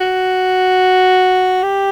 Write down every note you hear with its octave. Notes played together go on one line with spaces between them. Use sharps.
F#4
G4